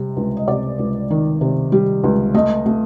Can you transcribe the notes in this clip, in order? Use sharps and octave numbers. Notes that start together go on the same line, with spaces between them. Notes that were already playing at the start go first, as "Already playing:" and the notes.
Already playing: C3 G3
C#2
D#5
C3 D5
C#2
D#3
C3
G3
C#2
A3 D#5
A3